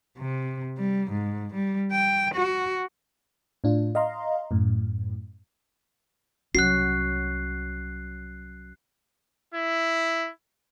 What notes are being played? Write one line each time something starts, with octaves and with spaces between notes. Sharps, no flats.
C3
G3
G#2
G3
G5
F#4
A2 D4 F4
D#5 F5 A#5 C6
F#2 A2
C2 F#3 C#4 F#4 F#6 C7
E4